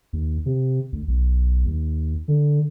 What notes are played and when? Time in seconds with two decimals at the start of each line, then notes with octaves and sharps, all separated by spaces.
0.13 D#2
0.46 C3
0.92 D2
1.08 B1
1.66 D#2
2.28 D3